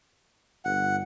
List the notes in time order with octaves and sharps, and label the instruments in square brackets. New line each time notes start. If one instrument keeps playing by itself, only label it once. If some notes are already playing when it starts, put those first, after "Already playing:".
[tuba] G1 [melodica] F#5